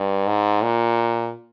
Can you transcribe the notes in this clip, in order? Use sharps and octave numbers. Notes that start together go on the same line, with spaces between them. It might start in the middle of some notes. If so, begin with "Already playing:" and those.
Already playing: G2
G#2
A#2